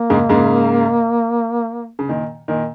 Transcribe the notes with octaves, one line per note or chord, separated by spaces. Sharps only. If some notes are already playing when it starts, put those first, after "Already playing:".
Already playing: A#3
G#2 C#3
G#2 C#3
C#3
A#2 D#3
A#2 D#3